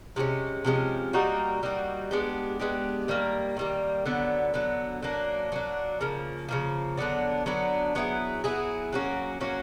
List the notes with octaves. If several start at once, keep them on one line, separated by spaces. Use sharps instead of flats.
C3 F3 G#3 C#4
C3 F3 G#3 C#4
G3 A#3 D#4 F#4
G3 A#3 D#4 F#4
G#3 B3 D4 G4
G#3 B3 D4 G4
D#3 G3 A#3
D#3 G3 A#3
D3 F#3 B3
D3 F#3 B3
F#3 A#3 D4
F#3 A#3 D4
C#3 F3 A#3
C#3 F3 A#3
D3 F#3 B3 D4
D3 F#3 B3 D4
F#3 B3 E4 G#4
F#3 B3 E4 G#4
F#3 A#3 C#4 F#4
F#3 A#3 C#4 F#4